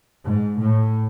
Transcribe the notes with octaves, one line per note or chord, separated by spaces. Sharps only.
G#2
A2